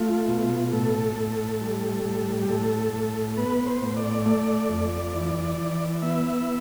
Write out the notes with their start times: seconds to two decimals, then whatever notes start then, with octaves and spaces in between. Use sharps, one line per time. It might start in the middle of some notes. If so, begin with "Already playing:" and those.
Already playing: A3 F4
0.28 B2
0.72 A2 A4
1.16 A2
1.61 G3
2.05 A2
2.43 G4
2.49 A2 A4
2.93 A2
3.37 B3 B4
3.66 C5
3.81 A2
3.97 D5
4.25 A3 D5
4.69 F2
5.14 E3
5.58 E3
6.02 B3 E5